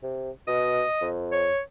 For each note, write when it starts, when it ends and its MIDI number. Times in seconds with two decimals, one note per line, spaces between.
0.03 0.30 48
0.48 0.83 47
0.48 1.07 75
1.01 1.51 41
1.32 1.60 73